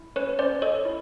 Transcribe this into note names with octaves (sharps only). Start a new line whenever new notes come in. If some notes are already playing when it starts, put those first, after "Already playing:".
Already playing: E4
C#4 B4 C#5
C#4 C5 D5
A4 C#5 D#5
E4